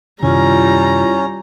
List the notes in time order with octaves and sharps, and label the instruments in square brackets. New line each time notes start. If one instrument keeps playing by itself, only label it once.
[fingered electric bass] F#2 C3 D#3 [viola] G3 A#5 [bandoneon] C#4 [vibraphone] E4 F4